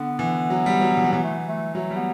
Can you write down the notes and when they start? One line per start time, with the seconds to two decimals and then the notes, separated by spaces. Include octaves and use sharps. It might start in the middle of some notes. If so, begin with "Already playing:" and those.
Already playing: D3 B3
0.19 E3
0.50 F#3
0.66 G3
0.81 F#3
0.97 E3
1.04 F#3
1.12 E3 B3
1.24 A3
1.48 A3
1.75 F#3 A3
1.90 G3
1.96 B3